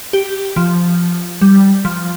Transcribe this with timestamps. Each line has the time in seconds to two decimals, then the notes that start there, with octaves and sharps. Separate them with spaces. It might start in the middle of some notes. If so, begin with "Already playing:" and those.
0.13 G4
0.56 F3
1.41 G3
1.85 F3